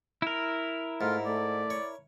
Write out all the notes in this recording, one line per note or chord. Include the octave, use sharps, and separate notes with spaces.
E4 A#4
G#2 A3 F4
A3 D5
C#5